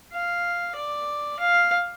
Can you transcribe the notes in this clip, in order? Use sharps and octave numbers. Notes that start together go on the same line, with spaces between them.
F5
D5
F5